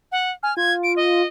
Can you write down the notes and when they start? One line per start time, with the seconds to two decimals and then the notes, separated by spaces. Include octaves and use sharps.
0.12 F#5
0.43 G#5 F6
0.57 F4 G#6
0.83 D7
0.96 D#5